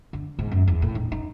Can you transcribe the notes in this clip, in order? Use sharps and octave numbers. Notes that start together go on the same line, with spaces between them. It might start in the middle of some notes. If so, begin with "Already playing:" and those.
D3
G#2
F#2
E2
A2
D#4
D#4